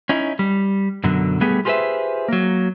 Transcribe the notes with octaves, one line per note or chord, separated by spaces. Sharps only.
C#4 D#4 E4
G3
F#2 B2 D3 F#3
G3 A3 B3 G4 G#4
F4 G4 G#4 B4 C5 E5
F#3 A#3